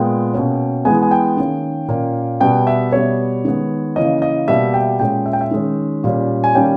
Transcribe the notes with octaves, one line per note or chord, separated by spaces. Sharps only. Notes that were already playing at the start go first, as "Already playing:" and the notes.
Already playing: A#2 G#3 B3 G5
B2 A#3 C#4
E3 G#3 B3 G#5
G#5
G5
D#3 A#3 C#4
A#2 A#3 C#4
B2 G3 B3 G5
E5
B2 G3 B3 C#5
D#3 G#3 B3
C#3 E3 A#3 C#4 D#5
D#5
B2 G3 A#3 E5
G5
A#2 G#3 C#4 G5
E5
G5
E5
D#3 G#3 C#4
A#2 G3 C#4
G#5
D#3 G3 A#3 C#4 G5